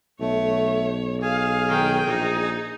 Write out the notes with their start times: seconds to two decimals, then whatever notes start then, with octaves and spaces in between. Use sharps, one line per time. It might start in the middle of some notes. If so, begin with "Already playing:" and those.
0.20 B1 A3 C#5
1.22 G#4 F5 G#5
1.68 D#3 G5
2.08 A#1 D#4